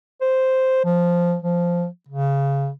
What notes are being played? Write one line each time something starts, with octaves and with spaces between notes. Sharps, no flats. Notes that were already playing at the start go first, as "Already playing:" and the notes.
C5
F3
F3
C#3